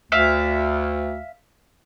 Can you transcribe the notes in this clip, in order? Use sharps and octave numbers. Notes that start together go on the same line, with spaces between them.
D2 E5 F5